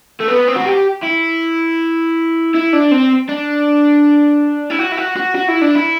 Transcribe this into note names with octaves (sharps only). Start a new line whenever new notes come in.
A3
B3
C4
F#4
G4
E4
E4
D4
C4
D4
E4
F#4
E4
F#4
F#4
F#4
E4
D4
E4